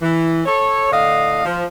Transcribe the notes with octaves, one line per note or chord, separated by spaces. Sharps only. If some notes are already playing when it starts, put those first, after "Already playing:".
E3
A4 C#5
A2 D3 D#5 F5
F3